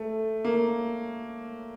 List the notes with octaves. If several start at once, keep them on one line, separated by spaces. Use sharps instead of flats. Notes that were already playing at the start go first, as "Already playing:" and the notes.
Already playing: A3
A#3